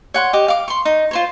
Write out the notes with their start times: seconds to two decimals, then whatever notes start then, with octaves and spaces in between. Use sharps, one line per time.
0.14 C#5 F#5 C6
0.33 G4 D#5 D6
0.48 F5 D6
0.68 C6 C#6
0.85 D#4
1.11 F4 C5 C#5